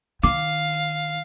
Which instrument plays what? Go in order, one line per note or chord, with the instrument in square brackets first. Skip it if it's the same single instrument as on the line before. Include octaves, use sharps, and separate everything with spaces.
[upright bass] D#3 [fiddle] F5 [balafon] D6